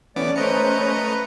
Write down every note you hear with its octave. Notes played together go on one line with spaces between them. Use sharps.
E3 A3 B3 C#4 D5 D6
A3 B4 C5 D#5 A#5 C#7